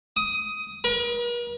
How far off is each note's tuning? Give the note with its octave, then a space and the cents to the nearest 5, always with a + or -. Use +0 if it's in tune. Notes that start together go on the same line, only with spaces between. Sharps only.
D#6 +15
A#4 +45